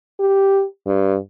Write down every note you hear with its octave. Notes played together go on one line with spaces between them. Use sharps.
G4
G2